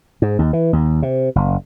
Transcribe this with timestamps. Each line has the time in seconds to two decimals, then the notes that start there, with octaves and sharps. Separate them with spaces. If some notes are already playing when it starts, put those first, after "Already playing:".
0.22 G#2
0.39 D#2
0.53 E3
0.73 D#2
1.02 C3
1.35 F#1